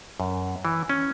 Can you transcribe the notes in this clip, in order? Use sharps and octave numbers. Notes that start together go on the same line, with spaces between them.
F#2
E3
C#4